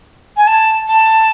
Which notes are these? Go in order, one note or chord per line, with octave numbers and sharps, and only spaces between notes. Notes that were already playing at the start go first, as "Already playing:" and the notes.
G#5
A5
A5